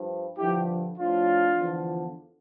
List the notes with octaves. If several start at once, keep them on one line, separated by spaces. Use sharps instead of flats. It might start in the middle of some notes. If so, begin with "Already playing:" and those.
Already playing: G2 F3
G2 D3 F3 E4 G4
A2 F3 D4 F4
E2 D3 F3